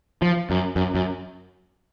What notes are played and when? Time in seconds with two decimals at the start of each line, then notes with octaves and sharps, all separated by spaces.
0.22 F3
0.50 F#2
0.76 F#2
0.95 F#2